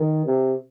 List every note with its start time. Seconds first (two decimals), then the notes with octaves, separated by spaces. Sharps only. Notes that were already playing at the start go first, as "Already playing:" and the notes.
Already playing: D#3
0.26 C3